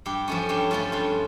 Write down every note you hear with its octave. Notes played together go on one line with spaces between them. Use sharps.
G2 G4
F3 A3 C#4
G2 G4
F3 A3 C#4 F4
G2 F4